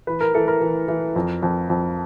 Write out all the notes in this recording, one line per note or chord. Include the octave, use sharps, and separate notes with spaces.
E3 B4
A#4
E3 A4
A#4
E3
E3
F2
F2
F2